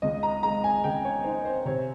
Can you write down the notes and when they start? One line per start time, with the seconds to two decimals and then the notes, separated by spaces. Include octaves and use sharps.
0.02 C#2 D#5
0.23 A#5
0.43 G#3 A#5
0.64 G#5
0.84 C#3 G5
1.05 C#5
1.24 D#4 C5
1.45 C5
1.65 C3 C#5